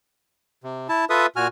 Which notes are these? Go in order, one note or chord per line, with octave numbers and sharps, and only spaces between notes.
C3
E4 A5
F4 A4 B4 E5 D#6
A#2 F#4 G#5 F6